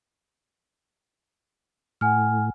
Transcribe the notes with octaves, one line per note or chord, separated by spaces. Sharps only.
A2 F#5 G#5 F6